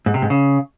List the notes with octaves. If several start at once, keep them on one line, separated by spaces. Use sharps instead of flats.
G#2
C3
G#2
C#3